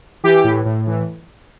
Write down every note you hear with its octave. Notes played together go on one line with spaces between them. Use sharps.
E3 G4
A2
A2
E3